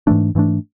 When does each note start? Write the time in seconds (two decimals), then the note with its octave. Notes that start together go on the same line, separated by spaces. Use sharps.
0.07 G#2 E3 A3 D4
0.35 G#2 E3 A3 D4